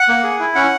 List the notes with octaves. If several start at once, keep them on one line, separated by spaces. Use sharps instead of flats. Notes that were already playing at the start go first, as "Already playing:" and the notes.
Already playing: F#5
A#3
G#4
E4
C#4 F#5